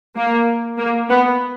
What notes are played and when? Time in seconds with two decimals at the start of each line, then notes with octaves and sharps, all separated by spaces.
0.16 A#3
0.78 A#3
1.09 B3